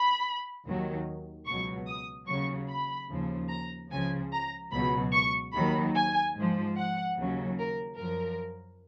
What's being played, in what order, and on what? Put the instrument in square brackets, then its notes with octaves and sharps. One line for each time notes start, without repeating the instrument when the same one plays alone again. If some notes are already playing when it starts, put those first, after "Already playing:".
Already playing: [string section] B5
D#2 D#3 F#3
C#2 B2 F#3 C#6
D#6
D#2 C#3 F#3 C#6
B5
D#2 C#3 F3
A#5
C#2 C#3 F3 G#5
A#5
C#2 B2 F#3 B5
C#6
D#2 D#3 F#3 B5
G#5
G#2 F3
F#5
D#2 C#3 F#3
A#4
F#2 F3 A#4